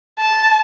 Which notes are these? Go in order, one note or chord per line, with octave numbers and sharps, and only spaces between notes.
A5